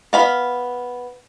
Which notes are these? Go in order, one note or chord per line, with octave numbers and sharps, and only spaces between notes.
B3 F5 B5